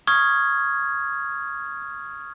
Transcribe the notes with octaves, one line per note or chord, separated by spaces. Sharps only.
C#6 D#6 F6 G#6